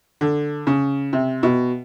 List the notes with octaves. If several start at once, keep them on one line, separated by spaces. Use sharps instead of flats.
D3
C#3
C3
B2